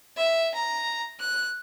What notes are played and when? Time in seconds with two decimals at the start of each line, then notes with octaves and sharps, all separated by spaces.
0.17 E5
0.55 A#5
1.20 F#6